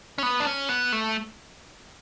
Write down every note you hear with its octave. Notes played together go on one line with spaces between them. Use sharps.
C#4
B3
D4
C#4
B3
A3